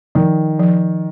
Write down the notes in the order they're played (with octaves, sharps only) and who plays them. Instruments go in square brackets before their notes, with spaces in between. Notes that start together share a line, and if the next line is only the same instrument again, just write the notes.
[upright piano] D#3 [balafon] F3
[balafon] F3